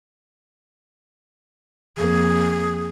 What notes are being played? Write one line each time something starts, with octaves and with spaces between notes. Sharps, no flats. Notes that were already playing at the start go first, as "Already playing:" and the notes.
F2 A#3 G#4